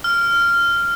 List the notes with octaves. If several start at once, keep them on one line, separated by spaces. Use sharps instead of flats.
F6